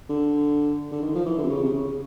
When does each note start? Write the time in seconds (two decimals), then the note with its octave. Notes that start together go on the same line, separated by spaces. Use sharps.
0.09 D3
0.92 D3
1.02 D#3
1.15 F3
1.26 E3
1.38 D3
1.43 C3
1.49 C#3
1.63 C3
1.73 C#3